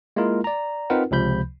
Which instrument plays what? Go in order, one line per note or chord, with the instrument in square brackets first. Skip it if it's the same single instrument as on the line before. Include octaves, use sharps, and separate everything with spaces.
[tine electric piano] G#3 A#3 E4 F4 A#4
D5 A#5
C4 D#4 F4 A#4 B4 F#5
C#2 C3 F3 B5 G6